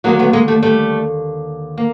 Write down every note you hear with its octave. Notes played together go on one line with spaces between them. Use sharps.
D#2 D3 F#3 G#3 A#3
A3 B3
G#3 A#3
G3 A3
G3 A3
A#3